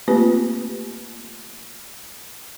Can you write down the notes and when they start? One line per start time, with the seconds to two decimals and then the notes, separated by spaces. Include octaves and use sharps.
0.08 A3 A#3 C4 F4 G4 B4